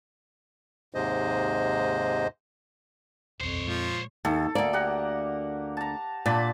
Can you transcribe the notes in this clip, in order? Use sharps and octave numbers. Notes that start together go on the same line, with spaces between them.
D#2 G#2 C3 G#3 C5 D#5
D#1 B1 F2 C5 C#5
A#2 F3 G#3
D#2 A4
D2 A#3 D5
G4 A#4 F#5
A5 A#5
A#2 D4 A5 B5